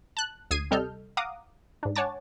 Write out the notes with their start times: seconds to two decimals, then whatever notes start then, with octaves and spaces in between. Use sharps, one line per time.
0.17 A5 F#6
0.51 D2 D#6 G#6 C7 D#7
0.71 C3 G3 A4 D#5 F6 G6
1.17 F5 F#5 A#5 D6 D#6
1.83 G#2 D4
1.96 C#5 F#5 G#5 A5 D6 A6